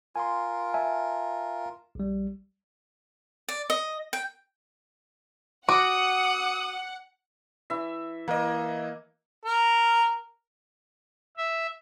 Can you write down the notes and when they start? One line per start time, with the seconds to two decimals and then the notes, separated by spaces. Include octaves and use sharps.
0.16 F4 A#4 G#5 C6
0.74 E5 G#5 A5
1.95 A#1 G3
3.48 D5
3.70 D#5
4.13 G5
5.69 F#4 F#5 D6 D#6
7.70 E3 E5
8.28 E3 A#3 D#5
9.45 A#4
11.37 E5